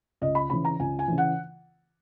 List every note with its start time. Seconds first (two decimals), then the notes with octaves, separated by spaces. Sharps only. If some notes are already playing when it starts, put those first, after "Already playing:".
0.21 C#2 D#5
0.35 B5
0.50 C#3 E3 B5
0.65 A#5
0.79 C#2 G#5
0.99 G#5
1.08 C#3 E3
1.18 F#5